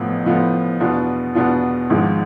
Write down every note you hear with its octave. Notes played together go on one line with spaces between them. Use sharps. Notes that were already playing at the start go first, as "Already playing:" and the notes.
Already playing: A1 A2 F3 B3
A1 A2 F3 B3 F4
E2 B2 B3 D4 F4
E2 B2 B3 D4 F4
G#1 G#2 F3 G#3